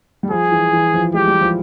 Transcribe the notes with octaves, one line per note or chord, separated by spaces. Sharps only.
G3
F3 G#4
E3
E3
F3
G#3 G4
G3
F3